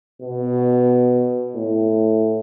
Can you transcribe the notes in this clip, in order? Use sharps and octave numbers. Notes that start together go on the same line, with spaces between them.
B2
A2